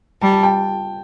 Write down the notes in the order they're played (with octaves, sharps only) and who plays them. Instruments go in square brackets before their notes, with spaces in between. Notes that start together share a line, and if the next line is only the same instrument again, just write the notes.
[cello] G3 [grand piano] A5
[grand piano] A5
G5